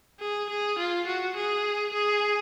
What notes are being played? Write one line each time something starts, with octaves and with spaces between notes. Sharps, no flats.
G#4
G#4
F4
F#4
G#4
G#4